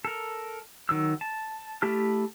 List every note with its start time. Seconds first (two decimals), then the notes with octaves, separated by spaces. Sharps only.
0.05 A4 A#4
0.89 D#3 F#3 E6
1.21 A5
1.82 A3 E4 G4 A5 F6